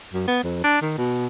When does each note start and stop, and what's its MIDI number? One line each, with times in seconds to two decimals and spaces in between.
0.13 0.27 42
0.28 0.39 59
0.44 0.60 41
0.64 0.81 62
0.82 0.95 51
0.98 1.27 47